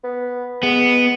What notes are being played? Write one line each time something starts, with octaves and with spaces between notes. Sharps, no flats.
B3
G#3 B3